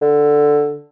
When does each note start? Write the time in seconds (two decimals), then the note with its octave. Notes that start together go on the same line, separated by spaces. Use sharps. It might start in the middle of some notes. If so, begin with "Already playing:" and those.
0.02 D3